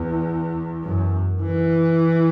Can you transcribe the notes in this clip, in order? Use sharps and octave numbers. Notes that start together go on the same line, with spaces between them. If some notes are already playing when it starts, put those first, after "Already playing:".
Already playing: E2
F#2
E3